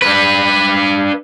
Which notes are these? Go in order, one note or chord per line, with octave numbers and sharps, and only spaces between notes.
D4 B4